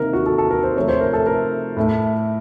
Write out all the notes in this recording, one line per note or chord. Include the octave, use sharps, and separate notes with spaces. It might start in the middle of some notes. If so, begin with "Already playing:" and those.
Already playing: C3 D#3 A#3 A#4
F#4
A4
A4
A#4
C5
C3 F3 A3 C#5
C5
A#4
A4
A#4
A2 A3